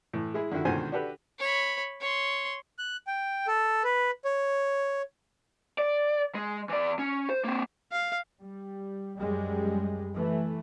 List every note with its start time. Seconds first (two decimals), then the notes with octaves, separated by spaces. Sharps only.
0.13 A2 E3
0.34 G#3 E4 G#4
0.51 D3 D#3 F3 E4 F#4
0.65 C#2 B2 D3 D#3 C5 G#5
0.92 D4 F#4 G4 A4 B4
1.39 C#5 B5
2.01 C#5 C6
2.79 F#6
3.07 G5
3.47 A4
3.84 B4
4.25 C#5
5.78 D5
6.35 G#3
6.69 E3 D5
6.99 C#4
7.30 C5
7.44 A#3 C4
7.92 F5
8.40 G3
9.20 F#2 G3 G#3
10.14 E3 A3